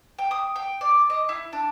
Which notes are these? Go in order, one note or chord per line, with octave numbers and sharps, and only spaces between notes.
G5
D#6
G5
D5
D#5
E4
D4